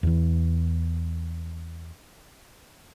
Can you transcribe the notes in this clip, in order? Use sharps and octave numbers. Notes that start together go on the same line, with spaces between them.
E2 E3